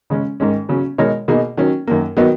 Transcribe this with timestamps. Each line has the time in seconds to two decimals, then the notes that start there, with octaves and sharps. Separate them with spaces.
0.10 C#3 G#3 C#4
0.40 G#2 D#3 G#3 C#4
0.69 C#3 F#3 C#4
0.98 B2 G#3 D#4 A#4 C#5
1.28 B2 A#3 D#4 G#4
1.57 D#3 F#3 C#4
1.87 F#2 D#3 A#3
2.17 D#3 F#3 B3 D#4